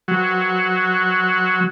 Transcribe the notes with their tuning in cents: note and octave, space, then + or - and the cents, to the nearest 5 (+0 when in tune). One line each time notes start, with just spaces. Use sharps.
F#3 +0 F#4 +0